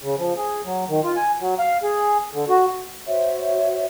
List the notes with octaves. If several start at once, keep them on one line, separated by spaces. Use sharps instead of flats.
C#3
F3
G#4
F#3
D#3
F4
G#5
F#3
F5
G#4
D3
F#4
F#4 C5 C#5 E5